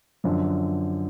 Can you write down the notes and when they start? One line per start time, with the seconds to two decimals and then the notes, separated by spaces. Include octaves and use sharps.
0.24 F#2 D3 F3